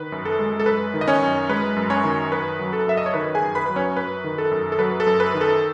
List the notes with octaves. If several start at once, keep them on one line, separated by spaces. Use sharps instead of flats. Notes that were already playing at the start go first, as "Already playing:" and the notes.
Already playing: D#3 B4
F#2
A4
G#3
A4
F#2 B4
D#3
D#5
C#4 C#5
F#2
G#3 B4
F#2
C#4 C#5
D#3
F#2 B4
F#3
A4
F#2 E5
D#5
C#5
D#3 B4
G#4 G#5
F#2
B4 B5
F#3 B4
C#4 C#5
F#2 B4
D#3
A4
F#2
A4
F#3 B4
A4
F#2
B4
D#3
A4